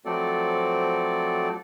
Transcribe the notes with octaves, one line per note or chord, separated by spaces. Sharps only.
F3 F#3 A3 C4 A4 D5